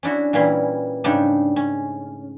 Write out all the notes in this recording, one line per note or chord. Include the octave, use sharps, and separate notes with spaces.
C#4 D4 E4 F#4
A#2 E3 G3 C#4 E4 C6
G#2 C#3 G3 A3 D4
C#4